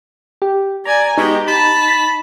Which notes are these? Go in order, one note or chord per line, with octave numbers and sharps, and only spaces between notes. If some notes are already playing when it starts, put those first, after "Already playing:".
G4
D5 G#5 A#5
B2 G#3 D#4 G4
A5 B5
B6